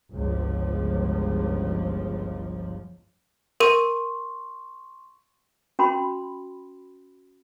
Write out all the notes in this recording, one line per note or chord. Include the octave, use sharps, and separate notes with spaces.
G1 C#2 F3 G#3
A#4 C6 C#6 D#7
C#4 F#4 B5 C6